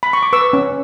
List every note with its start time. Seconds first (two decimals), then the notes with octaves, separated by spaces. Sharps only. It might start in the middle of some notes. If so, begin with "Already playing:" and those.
0.03 B5
0.13 C#6
0.23 D6
0.33 B4 C#6 E6
0.53 C#4